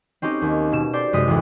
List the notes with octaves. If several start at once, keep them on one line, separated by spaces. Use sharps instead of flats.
C4 C#4 D#4 G4
D#2
B2 E7
G4 C5 D5
F#2 C3 G#3 D#6 B6
A1 D2